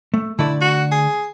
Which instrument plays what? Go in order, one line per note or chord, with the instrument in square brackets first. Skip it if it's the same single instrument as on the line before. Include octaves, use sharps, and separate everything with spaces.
[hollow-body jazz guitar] A3
[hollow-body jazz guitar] D3 A3 D5 [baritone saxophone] E4
[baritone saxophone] F#4
G#4